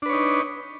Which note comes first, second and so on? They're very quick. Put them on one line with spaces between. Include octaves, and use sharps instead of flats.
D4 B4 C#5 D#4